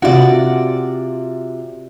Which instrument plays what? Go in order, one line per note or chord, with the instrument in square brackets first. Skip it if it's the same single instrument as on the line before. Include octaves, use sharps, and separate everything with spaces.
[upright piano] C3 F4 [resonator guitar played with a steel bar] F#4 D5